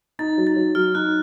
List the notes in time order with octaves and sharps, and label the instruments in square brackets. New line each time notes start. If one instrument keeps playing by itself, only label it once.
[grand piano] D#4 [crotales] A6
[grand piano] F#3
[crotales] A6
[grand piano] F#3
[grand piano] F#3 [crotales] F6
[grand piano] D#4 [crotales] F#6